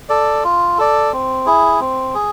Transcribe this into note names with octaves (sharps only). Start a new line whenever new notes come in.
A4 D5
F4
A4 D5
C4
E4 G#4
C4
G#4